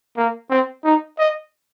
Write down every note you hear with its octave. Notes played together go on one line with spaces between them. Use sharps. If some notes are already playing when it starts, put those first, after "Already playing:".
A#3
C4
D#4
D#5